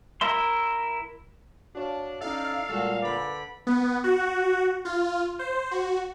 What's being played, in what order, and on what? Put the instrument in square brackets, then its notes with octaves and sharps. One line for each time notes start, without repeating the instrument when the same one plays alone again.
[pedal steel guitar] E4 A#4 E5 C6
[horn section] D4 [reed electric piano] F#4 C#5 F5
[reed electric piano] C#4 E4 E5 [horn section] D#4 A4 D5 [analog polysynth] F5
[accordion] A#2 [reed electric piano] G3 G#3 [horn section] F#4 A4
[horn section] D3 D5 B5 [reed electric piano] B4
[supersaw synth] B3
F#4
F4
C5
F#4